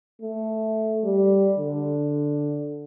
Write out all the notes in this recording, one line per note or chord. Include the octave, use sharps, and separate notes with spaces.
A3
G3
D3